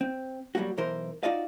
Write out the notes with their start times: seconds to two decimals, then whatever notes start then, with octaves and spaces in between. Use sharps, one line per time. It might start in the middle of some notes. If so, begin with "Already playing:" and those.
0.01 C4
0.55 F#3 G3 A3 A#3 F#4
0.77 B1 E3 A#4 C5
1.23 D#4 F4 F#4 D5 D#5 F5